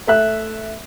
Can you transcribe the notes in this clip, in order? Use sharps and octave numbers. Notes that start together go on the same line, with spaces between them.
A3 E5 F#6